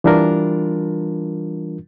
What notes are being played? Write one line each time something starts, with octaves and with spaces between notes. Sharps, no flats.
E3 G3 D4 F4 A#4